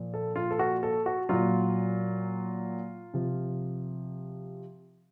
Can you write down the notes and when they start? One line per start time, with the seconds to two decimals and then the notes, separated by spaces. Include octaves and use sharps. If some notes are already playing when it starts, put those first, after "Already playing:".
Already playing: A#2 F3
0.14 A4
0.36 F4
0.51 A4
0.59 F#4
0.83 A4
1.06 F#4
1.29 A#2 F#3 F4
3.14 C3 F3